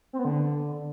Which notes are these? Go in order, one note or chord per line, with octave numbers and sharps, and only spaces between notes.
C4
B3
D3